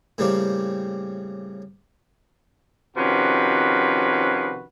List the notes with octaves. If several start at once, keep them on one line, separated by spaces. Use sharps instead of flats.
A2 C#3 G3 A#3 C4 G4
C3 D#3 F3 C#4 F#4 B4